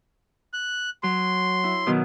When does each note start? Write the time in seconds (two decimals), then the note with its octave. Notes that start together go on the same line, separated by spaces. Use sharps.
0.54 F#6
1.03 F#3 C6
1.64 E4
1.86 B2 D#3 F#3